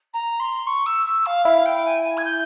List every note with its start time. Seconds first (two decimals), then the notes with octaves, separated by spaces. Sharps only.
0.13 A#5
0.39 C6
0.66 C#6
0.86 E6
1.06 E6
1.26 F5
1.45 E4 F5
1.65 G5
1.85 G#5
2.04 G#5
2.17 G#6
2.25 G6